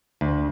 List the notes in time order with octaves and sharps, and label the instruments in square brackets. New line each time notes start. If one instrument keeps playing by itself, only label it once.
[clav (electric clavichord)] D2